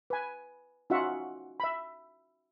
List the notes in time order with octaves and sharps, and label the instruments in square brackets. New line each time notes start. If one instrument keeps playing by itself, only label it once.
[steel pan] B4 G#5
C#4 D#4 F4 F#4 E5 F#5
E5 B5